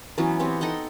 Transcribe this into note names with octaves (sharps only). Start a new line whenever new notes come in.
E3 F#3 B3 C#4
B3 C4 G4 C#5
D#4 A4 F#5 G5